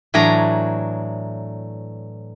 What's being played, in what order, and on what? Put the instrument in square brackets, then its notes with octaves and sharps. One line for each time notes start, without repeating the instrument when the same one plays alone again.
[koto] A2 E3 F#3 D4 A#5